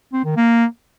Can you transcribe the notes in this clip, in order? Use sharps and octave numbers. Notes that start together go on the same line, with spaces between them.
C4
D#3
A#3